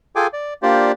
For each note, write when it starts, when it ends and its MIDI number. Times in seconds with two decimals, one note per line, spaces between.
0.16 0.27 65
0.16 0.27 68
0.16 0.27 69
0.16 0.27 79
0.16 0.27 80
0.16 0.27 86
0.33 0.54 74
0.63 0.92 58
0.63 0.92 62
0.63 0.92 65
0.63 0.92 67
0.63 0.92 72
0.63 0.92 74